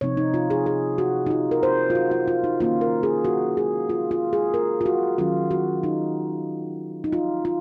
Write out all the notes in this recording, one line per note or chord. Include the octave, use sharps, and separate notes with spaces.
C3 F3 C4 D#4 C#5
D#4
F4
G#4
G#4
F#4
D#4
F4
A#4
C5
F4
F#4
F4
F4
D#4
D#3 A#3 C#4 F4
A#4
G#4
F#4
G#4
F4
F4
G#4
A#4
F4
F#4
D#3 F#3 C#4 F4
F#4
D#4
D#4
F4
F4